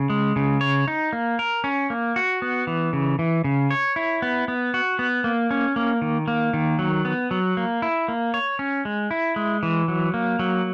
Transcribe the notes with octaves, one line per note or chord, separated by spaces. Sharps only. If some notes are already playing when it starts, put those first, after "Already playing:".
Already playing: C#3
G#3
C#3
C#5
D#4
A#3
A#4
C#4
A#3
F#4
B3
E3
C#3
E3
C#3
C#5
E4
B3
B3
F#4
B3
A#3
C#4
A#3
D#3
A#3
D#3
F#3
B3
F#3
A#3
E4
A#3
C#5
C#4
G#3
E4
G#3
E3
F#3
A#3
F#3